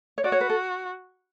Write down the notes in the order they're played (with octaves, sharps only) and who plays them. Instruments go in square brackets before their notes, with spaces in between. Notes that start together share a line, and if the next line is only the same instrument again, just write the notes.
[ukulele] C#5
[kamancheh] F#4 [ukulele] D5
[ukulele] C#5
B4
A4